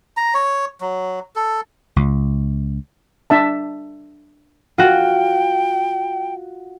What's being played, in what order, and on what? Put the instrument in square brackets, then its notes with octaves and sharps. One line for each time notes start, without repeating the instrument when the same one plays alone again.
[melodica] A#5
C#5
F#3
A4
[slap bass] C#2
[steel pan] D4 E5 A5
[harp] F4 F#4 [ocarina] G5